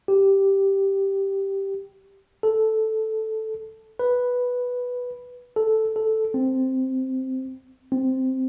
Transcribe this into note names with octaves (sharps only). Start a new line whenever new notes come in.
G4
A4
B4
A4
A4
C4
C4